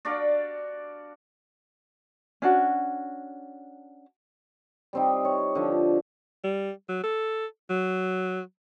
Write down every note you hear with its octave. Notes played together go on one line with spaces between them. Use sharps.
D4 F#4 D5 F5
C#4 D4 F#4
G3 C4 D#4
C#5
D3 F3
G3
F#3
A4
F#3